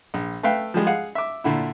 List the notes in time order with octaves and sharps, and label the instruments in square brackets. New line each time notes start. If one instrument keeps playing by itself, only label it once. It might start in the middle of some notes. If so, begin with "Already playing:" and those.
[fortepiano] A#1
A3 B4 E5 F5 G5
F3 G3 G#3
G#4 F5 F#5
E5 D6
A#2 D3 E4